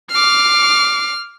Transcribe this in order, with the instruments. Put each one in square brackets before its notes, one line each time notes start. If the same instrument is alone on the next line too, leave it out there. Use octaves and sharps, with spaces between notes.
[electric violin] D6 C7 [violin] F6